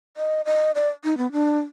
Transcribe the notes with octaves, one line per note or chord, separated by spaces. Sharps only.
D#5
D#5
D5
D#4
B3
D4